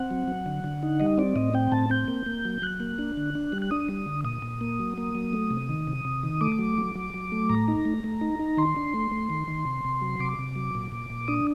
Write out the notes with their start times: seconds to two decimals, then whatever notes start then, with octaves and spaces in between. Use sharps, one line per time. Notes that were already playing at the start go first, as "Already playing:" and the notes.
Already playing: C4 F#5
0.11 F#3
0.28 F#3
0.46 D3
0.64 D3
0.83 D#4
1.00 G3 D#5
1.18 C4 D5
1.36 A2 D#5
1.54 C4 G5
1.72 A2 A5
1.90 C4 G6
2.08 A#3
2.26 A#3
2.45 F#3
2.62 F#3 F#6
2.80 A#3
2.99 D4
3.17 D3
3.35 D4
3.52 G3
3.62 F#6
3.71 D4 D#6
3.89 G3
4.06 D3
4.24 A#2 D#6
4.42 A#2
4.61 A#3
4.80 F#3
4.98 A#3
5.15 F#3
5.33 A3
5.51 C3
5.69 D#3
5.87 C3
6.05 C3
6.23 D#3
6.41 A3 D6
6.59 F#3
6.78 F#3
6.95 F#3
7.14 F#3
7.32 A3
7.49 A2 A#5
7.68 D#4
7.85 A3
8.04 A3
8.21 D#4
8.39 D#4
8.57 D#3 C6
8.76 D4
8.94 A3
9.11 A3
9.30 D#3
9.48 D#3
9.65 C3
9.85 C3
10.02 F#3
10.20 C3 D6
10.39 C3
10.56 F#3
10.75 A#2
10.92 A#2
11.10 A#2
11.28 D4 D#6